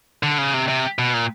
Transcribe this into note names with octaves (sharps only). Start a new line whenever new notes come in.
D3
C#3
C3
C3
B2
A#2